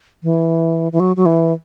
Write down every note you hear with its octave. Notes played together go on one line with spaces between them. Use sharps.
E3
E3
F#3
F#3
E3